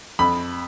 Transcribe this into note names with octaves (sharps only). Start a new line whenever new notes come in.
F2 B5